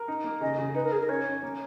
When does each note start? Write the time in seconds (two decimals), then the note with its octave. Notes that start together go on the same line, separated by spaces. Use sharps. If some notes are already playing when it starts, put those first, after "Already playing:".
Already playing: A#4
0.08 D#4
0.24 A#3
0.41 C#3 D#5
0.58 C#3
0.75 D#4 B4
0.84 A#4
0.91 D#4 G#4
1.01 A#4
1.09 C#4 C#5
1.26 C#4
1.43 A#3